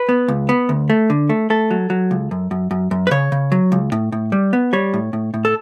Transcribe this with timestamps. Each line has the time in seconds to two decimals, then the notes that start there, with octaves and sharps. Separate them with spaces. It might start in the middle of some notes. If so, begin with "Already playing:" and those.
Already playing: B4
0.09 B3
0.28 C#2
0.49 B3
0.69 D2
0.90 A3
1.10 D3
1.29 A3
1.50 A3 A4
1.71 F#3
1.90 F#3
2.11 C#2
2.31 F#2
2.51 F#2
2.71 F#2
2.91 F#2
3.07 B4
3.11 C#3 C#5
3.32 C#3
3.52 F#3
3.72 C#2
3.92 A2
4.12 A2
4.32 G3
4.53 B3
4.73 G3 C#5
4.94 A2
5.13 A2
5.34 A2
5.45 A4